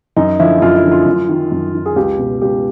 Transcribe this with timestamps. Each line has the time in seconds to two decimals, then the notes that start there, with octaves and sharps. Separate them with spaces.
0.16 F#2 D#4
0.39 D3 F3 E4
0.62 F#2 F4
0.76 E4
0.84 D3 F3
0.92 F4
1.06 F#2
1.29 D#3
1.52 F#2
1.74 D#3
1.86 G#4
1.96 C#2 G4
2.18 B2
2.42 C#2 G4